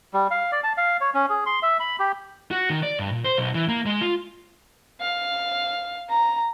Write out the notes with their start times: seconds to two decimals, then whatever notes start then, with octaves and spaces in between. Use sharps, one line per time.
0.14 G3
0.31 F5
0.52 D5
0.64 A5
0.77 F5
1.01 C#5
1.14 C#4
1.30 G#4
1.46 C6
1.62 E5
1.80 B5
2.00 G4
2.51 F#4
2.70 D#3
2.83 D5
3.00 G2
3.12 A#2
3.24 C5
3.38 B1
3.55 E3
3.68 A#3
3.86 G#3
4.01 F4
5.01 F5
6.09 A#5